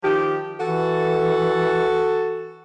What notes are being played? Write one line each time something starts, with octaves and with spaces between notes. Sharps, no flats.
D#3 F3 G4
E3 F#4 A4